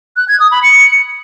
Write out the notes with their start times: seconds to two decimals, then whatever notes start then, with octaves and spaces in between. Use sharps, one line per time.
0.17 F#6
0.28 G#6
0.40 D#6
0.51 B5
0.63 C#7